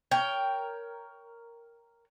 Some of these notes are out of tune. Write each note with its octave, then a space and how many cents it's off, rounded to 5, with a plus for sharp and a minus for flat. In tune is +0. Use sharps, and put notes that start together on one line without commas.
A#4 +0 C#5 +15 G5 +0